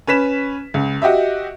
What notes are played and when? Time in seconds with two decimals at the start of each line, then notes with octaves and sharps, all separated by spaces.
0.07 C#4 B4 B6 E7
0.74 C#2
1.02 F#4 G4 D#5 E5